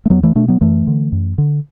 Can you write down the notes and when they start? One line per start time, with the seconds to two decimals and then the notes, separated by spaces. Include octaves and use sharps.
0.06 A3
0.10 E2 F#3 B3
0.23 E3 A3
0.35 B2 A3 D4
0.48 F#3 B3
0.61 F#2 E3 A3
0.87 D3
1.12 F#2
1.38 D3